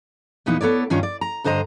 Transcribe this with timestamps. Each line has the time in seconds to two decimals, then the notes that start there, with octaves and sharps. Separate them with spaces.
0.46 E2 A#2 E3 B3 D#4
0.61 B3 A4 C#5 D5
0.90 G2 D#3 C#4 D4 F4
1.03 D5
1.21 A#5
1.44 G2 D3 C5 D#5 A#5